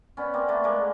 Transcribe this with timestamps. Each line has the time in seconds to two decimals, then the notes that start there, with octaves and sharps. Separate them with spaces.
0.17 B3 C#4 D5
0.34 A#3 C4
0.49 A3 B3
0.64 G#3 A#3